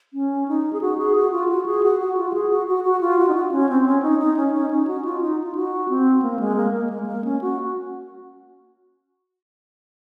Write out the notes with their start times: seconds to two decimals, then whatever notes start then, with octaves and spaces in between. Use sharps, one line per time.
0.14 C#4
0.48 D#4
0.73 G#4
0.81 F#4
0.98 G#4
1.16 F#4
1.32 F4
1.49 F#4
1.66 G#4
1.83 F#4
2.00 F#4
2.17 F4
2.29 F#4
2.34 G#4
2.50 F#4
2.67 F#4
2.84 F#4
3.01 F4
3.19 F#4
3.29 D#4
3.35 F4
3.51 C#4
3.69 C4
3.86 C#4
4.03 D#4
4.19 D#4
4.37 C#4
4.54 C#4
4.71 D#4
4.87 F#4
5.05 F4
5.21 D#4
5.44 F4
5.55 F#4
5.89 C4
6.22 A#3
6.40 G#3
6.56 A#3
6.73 A#3
6.90 G#3
7.03 G#3
7.06 A#3
7.24 C#4
7.41 F#4